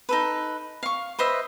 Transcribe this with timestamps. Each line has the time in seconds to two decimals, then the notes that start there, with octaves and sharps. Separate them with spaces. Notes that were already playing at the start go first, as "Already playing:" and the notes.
0.09 D#4 A4 B4
0.83 F5 C#6
1.19 B4 C5 D#5 E5